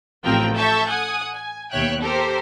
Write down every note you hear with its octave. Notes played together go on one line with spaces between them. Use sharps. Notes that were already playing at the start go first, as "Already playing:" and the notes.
A1 F3 C4 A#4 G5
A4 E5 A5 C#6 G6
F#5 G#5 D#6
G#5
D#2 B2 C#5 E5 G5 F#6
G4 A4 A#4 C5